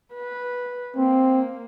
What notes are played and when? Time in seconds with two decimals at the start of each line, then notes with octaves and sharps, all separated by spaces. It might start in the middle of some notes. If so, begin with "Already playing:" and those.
0.14 B4
0.97 A#3 C4